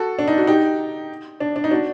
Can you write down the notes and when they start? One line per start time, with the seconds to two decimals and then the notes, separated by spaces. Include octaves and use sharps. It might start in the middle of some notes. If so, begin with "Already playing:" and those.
Already playing: F#4 A4
0.19 D4
0.28 D#4
0.37 F#4
0.47 D#4 G4
1.40 D4
1.56 D4
1.64 D#4
1.71 D4 F#4